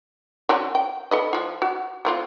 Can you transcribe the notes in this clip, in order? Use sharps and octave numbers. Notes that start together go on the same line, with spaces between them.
F#3 C4 C#4
G5
A4 B4 D#5
F3 F4
F#4
A3 C4 F4